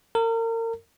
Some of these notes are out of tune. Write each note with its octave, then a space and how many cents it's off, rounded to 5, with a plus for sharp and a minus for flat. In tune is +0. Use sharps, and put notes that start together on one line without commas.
A#4 -35